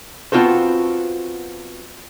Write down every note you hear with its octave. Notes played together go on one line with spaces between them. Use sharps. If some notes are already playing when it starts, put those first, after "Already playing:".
B3 C4 F4 F#4 A4 C5